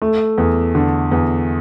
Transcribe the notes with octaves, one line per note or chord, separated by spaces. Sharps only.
A3
E2
D3
E2